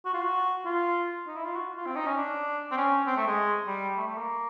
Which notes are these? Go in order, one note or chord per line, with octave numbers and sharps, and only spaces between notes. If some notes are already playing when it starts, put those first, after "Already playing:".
F#4
F4
F#4
F4
D#4
E4
F4
F#4
F4
C4
D#4
C#4
D4
C4
C#4
C4
A3
G#3
G3
A3
A3
A#3